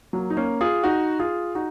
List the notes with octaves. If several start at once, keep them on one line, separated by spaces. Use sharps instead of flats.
F#3 A#3
D#4
A#3 C#4
F4 G#4
D#4 F#4
F4 G#4
D#4 F#4